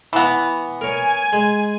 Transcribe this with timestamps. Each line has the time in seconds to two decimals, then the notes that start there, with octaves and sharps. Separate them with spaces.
0.13 E3 B3 A5 A#5
0.81 A#4 C#5 G#5
1.33 G#3